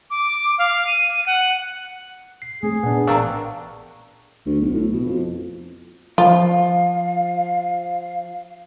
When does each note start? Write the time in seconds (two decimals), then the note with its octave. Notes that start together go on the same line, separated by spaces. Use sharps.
0.10 D6
0.58 F5
0.87 D#7
1.26 F#5
2.42 C7
2.63 A3 C4 C#4 G#4
2.83 A#2 B3 D4
3.07 A1 C3 A#3 D4 F5 C#6 E6
4.46 D2
4.61 B1
4.73 A2
4.92 B2
5.05 F2
6.18 F3 F4 F5